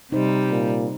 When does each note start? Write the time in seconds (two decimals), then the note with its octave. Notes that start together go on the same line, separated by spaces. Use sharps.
0.12 C3 G3 D#4 C5
0.51 A#2